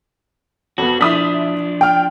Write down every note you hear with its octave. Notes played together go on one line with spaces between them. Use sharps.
F2 B3 F#4
F3 D4 E4 D#6 B6
G5 F6